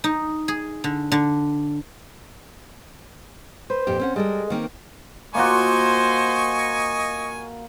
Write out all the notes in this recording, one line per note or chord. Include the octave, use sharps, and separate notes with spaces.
D#4
G#4
D3
D3
B4 C5
F2 A#2 G4
C4 C#4 F#5
G3 G#3 A4 A#4
D#3 A#3 C4
A#3 F4 F#4 C5 D#5 G#5 C#6